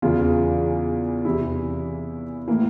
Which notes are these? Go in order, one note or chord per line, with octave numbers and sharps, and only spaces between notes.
E2 C#3 E3 F4
E2 C3 E3 E4
A2 E3 A#3